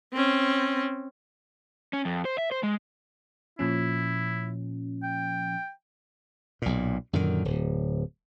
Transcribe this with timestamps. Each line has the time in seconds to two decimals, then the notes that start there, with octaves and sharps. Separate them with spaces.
0.13 C4 C#4
1.93 C#4
2.05 F2
2.25 C5
2.38 E5
2.51 C5
2.63 G#3
3.59 A#2 F3 C#4 E4
5.03 G5
6.62 B1 A#2
7.13 F#2 A#2 D3 D#3
7.45 D1